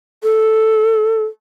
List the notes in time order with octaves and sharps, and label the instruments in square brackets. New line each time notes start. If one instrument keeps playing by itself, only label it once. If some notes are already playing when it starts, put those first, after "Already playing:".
[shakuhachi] A4